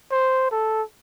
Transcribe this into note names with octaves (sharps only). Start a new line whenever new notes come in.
C5
A4